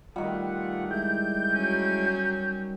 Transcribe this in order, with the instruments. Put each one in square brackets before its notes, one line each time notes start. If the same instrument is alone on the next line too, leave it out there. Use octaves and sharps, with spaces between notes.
[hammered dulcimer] D#3 G3 [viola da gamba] A3 [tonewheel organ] F4 F#5
[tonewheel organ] G#3 E4 G5 [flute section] G6
[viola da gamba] F#3 C#4